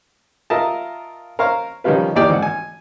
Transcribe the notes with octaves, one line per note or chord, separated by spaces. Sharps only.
F4 A#4 D#5 E5 A5
A#4 C5 C#5 F5
D#3 F3 G3 C#4 F4 B4
E2 A#3 D#4 G4 D5 G5
G#1 F#5
G#5